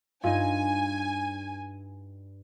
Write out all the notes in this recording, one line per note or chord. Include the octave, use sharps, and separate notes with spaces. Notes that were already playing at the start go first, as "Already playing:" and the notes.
G2 D#4 F4 G#5